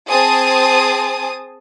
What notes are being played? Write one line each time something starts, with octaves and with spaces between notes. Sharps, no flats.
C4 G#4 G#5 A5 D#6